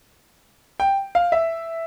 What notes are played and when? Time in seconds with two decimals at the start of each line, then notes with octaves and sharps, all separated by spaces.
0.80 G5
1.15 F5
1.32 E5